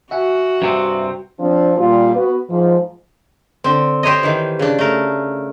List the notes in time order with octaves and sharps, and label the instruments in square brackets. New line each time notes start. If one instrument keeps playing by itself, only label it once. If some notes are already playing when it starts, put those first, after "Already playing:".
[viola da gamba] F#4 [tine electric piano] E5 F#5 G#5
[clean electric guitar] G2 C3 C4
[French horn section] F3 C4 D4
A#2 G3 F4
B3 F#4 B4
G#2 F3
[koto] D3 C4
G4 C5 C#5 D#5
D#3 E3
C#3 D4
A3 A#4